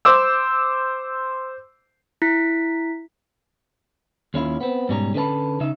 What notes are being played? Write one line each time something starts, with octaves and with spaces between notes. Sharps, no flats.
C5 D6 E6
E4 B6
D#2 C#4 E4 F4
B3 C4
G#2 B2 G3 C#4 C#5 A#5
D3 C#4 B4 D5 A5 B5
C#3 D#4 E5